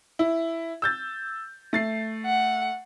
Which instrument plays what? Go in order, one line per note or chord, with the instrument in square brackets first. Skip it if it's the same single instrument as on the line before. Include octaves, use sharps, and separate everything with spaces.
[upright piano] E4
E6 G6 A6
A3 A6 C7
[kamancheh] F#5